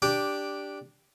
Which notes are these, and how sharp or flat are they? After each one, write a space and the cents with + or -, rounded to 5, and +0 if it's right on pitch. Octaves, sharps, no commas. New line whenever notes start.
D4 -5 G4 +0